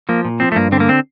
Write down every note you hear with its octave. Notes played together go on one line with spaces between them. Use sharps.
F3 A#3
A#2
F3 C4
A3
G2 A#3
D3 C4
A#3
C4